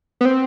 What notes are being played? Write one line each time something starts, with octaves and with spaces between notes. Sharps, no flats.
B3
C4